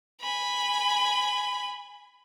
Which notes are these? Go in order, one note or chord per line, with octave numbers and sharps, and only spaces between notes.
G#5 B5